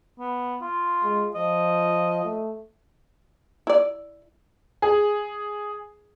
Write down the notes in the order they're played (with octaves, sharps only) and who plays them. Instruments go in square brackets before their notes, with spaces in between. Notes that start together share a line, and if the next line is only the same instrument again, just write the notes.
[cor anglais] B3
F4
[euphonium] G#3
[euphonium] F3 [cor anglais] D#5
[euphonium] A3
[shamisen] E4 D5
[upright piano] G#4